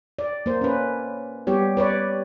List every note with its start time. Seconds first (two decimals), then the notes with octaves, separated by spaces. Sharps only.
0.19 D5
0.46 A#3 C5
0.61 C#4 B4
1.47 G3 B3 G4 C#5
1.77 B4 C#5 D5